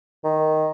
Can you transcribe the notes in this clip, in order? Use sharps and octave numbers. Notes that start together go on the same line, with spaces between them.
D#3